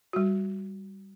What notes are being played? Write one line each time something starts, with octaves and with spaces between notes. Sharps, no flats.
G3 F#4